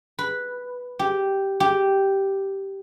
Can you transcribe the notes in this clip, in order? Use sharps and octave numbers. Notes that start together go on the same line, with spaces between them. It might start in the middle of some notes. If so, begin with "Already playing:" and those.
B4
G4
G4